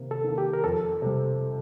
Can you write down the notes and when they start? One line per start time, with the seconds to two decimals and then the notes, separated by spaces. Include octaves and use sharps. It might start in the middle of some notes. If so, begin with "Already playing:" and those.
Already playing: C3 D#3 A#3
0.11 A4
0.24 D#3 A#3
0.38 G4
0.53 A#4
0.64 F2 A4
1.02 C3 G3